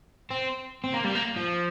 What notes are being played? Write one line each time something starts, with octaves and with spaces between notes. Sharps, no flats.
C4
C4
A#3
G3
A#3
F3